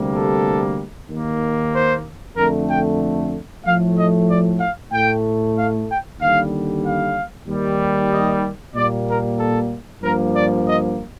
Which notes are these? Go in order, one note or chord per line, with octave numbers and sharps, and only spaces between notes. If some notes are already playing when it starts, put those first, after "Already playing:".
Already playing: D2 C3 G3 A#3
A4
D#2 D#3 A#3
C5
F2 D3 A3 A#4
G5
A2 F3 A3 F5
D#5
D5
F5
A2 A3 G5
F5
G5
D#2 D3 G3 F5
F5
D#2 D#3 G3
D#5
A#2 G3 A#3 D5
A#4
A4
G2 F3 A#3 A#4
D5
D#5